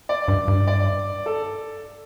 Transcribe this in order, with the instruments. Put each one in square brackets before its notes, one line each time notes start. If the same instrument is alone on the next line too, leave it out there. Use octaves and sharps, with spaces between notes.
[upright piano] D5
[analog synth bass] G2
G2
[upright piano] D5
A4